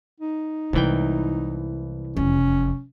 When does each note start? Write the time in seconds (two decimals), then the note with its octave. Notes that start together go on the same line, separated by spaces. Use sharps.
0.20 D#4
0.73 C2 E3 G#3 A3 G5
2.17 F1 E2 C#4